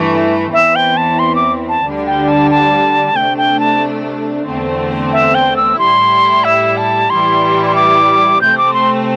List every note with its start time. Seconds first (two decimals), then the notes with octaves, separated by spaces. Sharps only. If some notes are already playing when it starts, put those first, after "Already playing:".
Already playing: G2 E3 A3
0.53 E2 E3 C4 E5
0.76 G5
0.97 A5
1.19 C6
1.35 D6
1.69 A5
1.85 D2 D3 G3 D4
2.07 G5
2.29 A5
2.51 A5
3.16 C3 A3 D4 G5
3.38 G5
3.60 A5
4.47 E2 D3 A3 C4
5.13 E5
5.35 G5
5.57 E6
5.79 A2 G3 E4 C6
6.44 E5
6.77 A5
7.10 A2 E3 G3 E4 C6
7.66 C6
7.75 D6
8.41 C3 A3 C4 G6
8.58 D6
8.74 C6